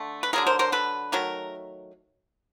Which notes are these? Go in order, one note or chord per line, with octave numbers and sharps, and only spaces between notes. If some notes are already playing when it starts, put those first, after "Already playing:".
Already playing: D3 A3
B4
D3 F#3 B3 G#4 A#4
A#4 C5
A#4 C5
A4 B4
D#3 F#3 A3 A#4